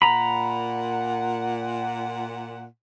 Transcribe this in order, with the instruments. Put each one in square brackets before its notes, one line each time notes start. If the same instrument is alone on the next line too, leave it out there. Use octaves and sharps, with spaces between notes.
[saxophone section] A#2 F#5 [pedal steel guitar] A#5 B5